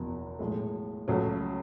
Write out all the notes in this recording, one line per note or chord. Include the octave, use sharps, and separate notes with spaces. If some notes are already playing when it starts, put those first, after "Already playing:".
Already playing: F#1 E2 B2
B1 A2 G#3
C#2 C#3 F#3 A3